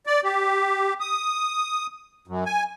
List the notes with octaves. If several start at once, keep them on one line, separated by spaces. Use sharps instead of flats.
D5
G4
D#6
F#2
G#5